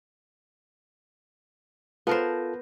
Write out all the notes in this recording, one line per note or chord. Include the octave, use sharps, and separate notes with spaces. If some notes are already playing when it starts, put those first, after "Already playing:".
B3 F4 A4 A#4 C5 A5